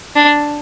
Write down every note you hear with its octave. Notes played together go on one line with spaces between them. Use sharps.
D4